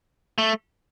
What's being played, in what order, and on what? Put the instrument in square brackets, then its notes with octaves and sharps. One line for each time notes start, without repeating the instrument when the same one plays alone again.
[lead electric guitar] A3